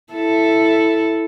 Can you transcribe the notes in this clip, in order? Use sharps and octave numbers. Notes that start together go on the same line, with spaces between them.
E4 A4